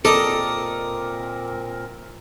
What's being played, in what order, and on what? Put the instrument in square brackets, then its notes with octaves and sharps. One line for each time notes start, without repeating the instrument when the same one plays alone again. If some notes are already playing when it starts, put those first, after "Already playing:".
[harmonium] A#2 C4 A#4 [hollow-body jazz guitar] A4 [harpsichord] D5 D#5 A#5